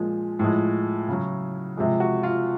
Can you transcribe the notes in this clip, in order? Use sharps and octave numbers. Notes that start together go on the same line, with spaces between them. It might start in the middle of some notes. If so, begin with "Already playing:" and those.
Already playing: A#2 F3 G#3
A2 F3 G#3
C#3 F#3
C3 F3 G#3
F#4
F4